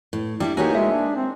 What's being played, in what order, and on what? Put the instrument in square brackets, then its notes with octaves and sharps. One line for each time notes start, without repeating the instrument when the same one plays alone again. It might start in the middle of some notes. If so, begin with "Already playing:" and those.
[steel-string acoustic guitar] A2
[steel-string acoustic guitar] G3 E4 D5 [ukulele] D4
[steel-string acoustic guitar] A#3 C#5 G#5 [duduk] D#4 [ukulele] F#4 G4
[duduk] G#3 [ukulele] E5
[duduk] D4
C4